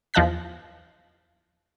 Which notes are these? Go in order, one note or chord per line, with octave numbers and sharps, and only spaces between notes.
E2 F3 D#5 A5 F#6 B6